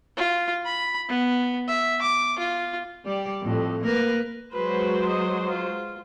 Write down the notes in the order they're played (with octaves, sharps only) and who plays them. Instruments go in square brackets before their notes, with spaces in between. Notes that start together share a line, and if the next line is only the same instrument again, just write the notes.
[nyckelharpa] F4
B5
B3
E5
D6
F4
[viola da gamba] G3 G4 D5
F2 A2 A3
A#3 A#4 B4
[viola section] F#3 G#3 C5 [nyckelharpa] B4
[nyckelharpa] D#5
F4